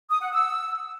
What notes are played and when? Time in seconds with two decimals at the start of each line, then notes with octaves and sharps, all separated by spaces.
0.10 D#6
0.21 F#5
0.32 E6